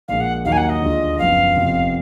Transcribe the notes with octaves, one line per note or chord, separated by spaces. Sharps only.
A#1 A#2 G#3 F5
F#5
D#2 D#3 F#3 A#3 D#4 F5
G#5
F#5
D#5
D2 D3 G#3 D4 F4
F#1 F#2 F3 B3 F5
F1 F2 F3 B3